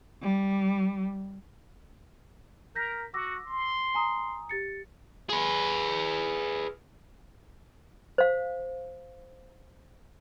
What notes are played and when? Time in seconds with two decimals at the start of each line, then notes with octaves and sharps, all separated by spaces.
0.22 G3
2.76 A#4 G6 A#6 B6
3.14 F#4 D6 E6 A#6
3.47 C6
3.94 G#5 A#5 D#6
4.49 G4 A6 C#7
5.30 G#4 B4
8.18 C5 F5